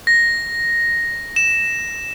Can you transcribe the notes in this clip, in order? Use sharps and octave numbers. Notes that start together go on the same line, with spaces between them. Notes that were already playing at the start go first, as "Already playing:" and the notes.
A#6
E7